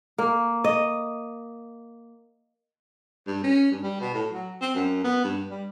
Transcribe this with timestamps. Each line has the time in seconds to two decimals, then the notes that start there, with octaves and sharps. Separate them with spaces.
0.18 A#3
0.64 D#5
3.27 G2
3.44 C#4
3.71 G2
3.83 G3
4.00 B2
4.14 A2
4.31 F#3
4.61 C4
4.75 F#2
5.04 B3
5.24 G2
5.50 G3